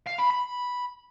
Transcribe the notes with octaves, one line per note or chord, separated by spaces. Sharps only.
F5
B5
B5